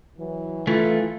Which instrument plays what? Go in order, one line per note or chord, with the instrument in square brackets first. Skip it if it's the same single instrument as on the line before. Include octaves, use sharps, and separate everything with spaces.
[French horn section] E3 F#3
[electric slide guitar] E3 A3 [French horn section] F4